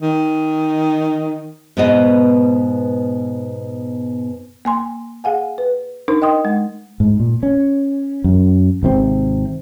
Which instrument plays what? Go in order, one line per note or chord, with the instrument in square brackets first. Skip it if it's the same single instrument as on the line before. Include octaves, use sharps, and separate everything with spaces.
[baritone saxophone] D#3
[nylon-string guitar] G#2 B2 B3 D#5
[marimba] A#3 G#5 C6
G#4 F5 F#5 G#5
B4
D4 D#4 A#4 C5
D#5 G5 C6 D#6
G#3
[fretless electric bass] G#2
A#2
C#4
F#2
G#1 C3 C4